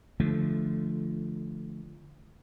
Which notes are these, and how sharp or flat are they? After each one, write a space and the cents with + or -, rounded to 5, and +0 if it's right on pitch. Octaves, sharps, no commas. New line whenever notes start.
D3 +0 F3 -20 A3 -15